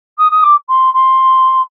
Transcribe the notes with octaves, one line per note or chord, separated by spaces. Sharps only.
D#6
D#6
D6
C6
C6